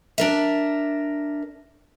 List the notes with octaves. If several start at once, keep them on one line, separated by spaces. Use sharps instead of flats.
D4 A#4 E5